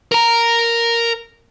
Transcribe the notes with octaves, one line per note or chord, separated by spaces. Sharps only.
A#4 A#5